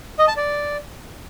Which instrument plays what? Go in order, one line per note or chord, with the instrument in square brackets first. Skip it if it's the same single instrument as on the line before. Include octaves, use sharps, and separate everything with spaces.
[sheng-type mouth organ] D#5
A5
D5